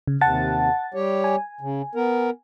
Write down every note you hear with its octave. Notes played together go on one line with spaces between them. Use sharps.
C#3
D#2 C3 F#5 A5 A6
G3 G4 C#5
G#5
C#3
B3 A#4